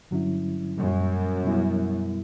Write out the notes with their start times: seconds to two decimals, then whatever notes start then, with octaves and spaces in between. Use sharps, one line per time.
0.11 G2 D3 F#3 C#4 E4
0.77 F#2 A#2 G3 A#3
1.44 B2 G3 B3 E4